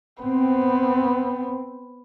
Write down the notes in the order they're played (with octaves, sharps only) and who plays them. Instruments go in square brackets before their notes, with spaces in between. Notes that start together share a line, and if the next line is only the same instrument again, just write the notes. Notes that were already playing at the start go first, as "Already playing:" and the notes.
[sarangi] B3 [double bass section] C4